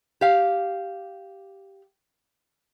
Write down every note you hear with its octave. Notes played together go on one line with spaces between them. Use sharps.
G4 F5